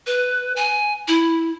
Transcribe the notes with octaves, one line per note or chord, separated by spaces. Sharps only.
B4
G#5
E4